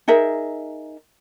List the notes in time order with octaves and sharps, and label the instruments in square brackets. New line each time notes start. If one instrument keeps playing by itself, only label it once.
[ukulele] D#4 G#4 A#4 E5